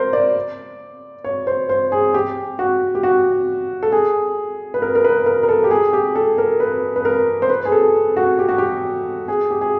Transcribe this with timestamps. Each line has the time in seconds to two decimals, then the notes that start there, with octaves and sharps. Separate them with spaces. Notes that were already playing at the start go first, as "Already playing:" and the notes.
Already playing: A#4 C5
0.13 D5
1.24 C#5
1.47 C5
1.69 C5
1.92 G#4
2.14 G4
2.59 F#4
2.95 G4
3.03 F#4
3.83 A4
3.92 G#4
4.74 B4
4.82 A#4
4.95 A#4
5.04 B4
5.26 A#4
5.43 A#4
5.49 A4
5.64 G4
5.71 G#4
5.93 G4
6.15 A4
6.38 A#4
6.60 B4
6.96 B4
7.05 A#4
7.42 C5
7.49 B4
7.65 G#4
7.72 A4
8.17 F#4
8.39 G4
8.49 F#4
8.58 G4
9.28 G#4
9.51 G4
9.61 G#4